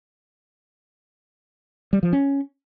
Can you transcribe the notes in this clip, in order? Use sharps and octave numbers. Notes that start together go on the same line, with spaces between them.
G3
F3
C#4